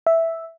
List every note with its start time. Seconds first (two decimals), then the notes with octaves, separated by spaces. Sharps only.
0.07 E5